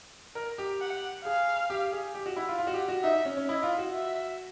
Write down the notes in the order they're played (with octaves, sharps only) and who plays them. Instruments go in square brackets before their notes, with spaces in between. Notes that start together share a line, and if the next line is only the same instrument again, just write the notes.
[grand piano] A#4
G4
[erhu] F#5
[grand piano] G#4 [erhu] F5
[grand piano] G4
G#4
G4
F#4
E4
F4
F4
F#4
G4
F#4
[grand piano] D#4 [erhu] E5
[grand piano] C#4
C#4
[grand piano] E4 [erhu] D#5
[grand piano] F4
F#4
[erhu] E5